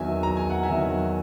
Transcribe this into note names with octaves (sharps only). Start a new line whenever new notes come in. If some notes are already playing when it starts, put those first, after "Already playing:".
Already playing: E2 D#3 F#3 E5 G#5
A#5
G#5
F#5
E5 G#5
E2 D#3 F#3